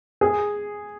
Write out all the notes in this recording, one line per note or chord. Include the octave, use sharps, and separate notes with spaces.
G#4